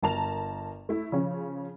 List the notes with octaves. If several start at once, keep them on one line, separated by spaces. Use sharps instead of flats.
G1 A#4 A5 A#5 F7
A3 E4
C#3 F3 C#4